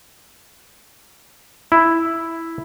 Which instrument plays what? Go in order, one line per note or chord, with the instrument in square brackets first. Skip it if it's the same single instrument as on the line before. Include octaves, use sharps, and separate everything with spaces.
[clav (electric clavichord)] E4